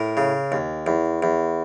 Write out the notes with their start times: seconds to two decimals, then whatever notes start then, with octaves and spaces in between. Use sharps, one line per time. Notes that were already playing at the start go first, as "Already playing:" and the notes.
Already playing: A2 A#4
0.17 C#3
0.52 D#2
0.87 E2
1.23 E2